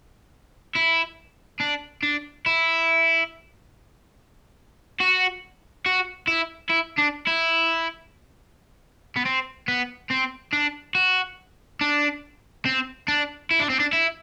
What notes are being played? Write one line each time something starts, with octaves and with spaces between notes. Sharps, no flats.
E4
D4
D4
E4
F#4
F#4
E4
E4
D4
E4
B3
C4
B3
C4
D4
F#4
D4
C4
D4
E4
D4
C4
D4
E4